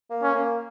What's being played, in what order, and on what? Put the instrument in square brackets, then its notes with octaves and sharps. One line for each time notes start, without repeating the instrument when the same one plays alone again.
[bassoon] A#3
[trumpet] C#4
[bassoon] A#3